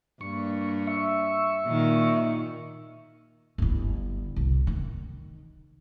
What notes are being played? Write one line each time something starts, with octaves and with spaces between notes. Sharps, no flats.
G2 A#3 C#6
E5 C#6
A#2 D#3
G1 E4
C2
D#3